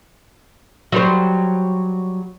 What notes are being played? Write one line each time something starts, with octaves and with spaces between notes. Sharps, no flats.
F#3 G3 C5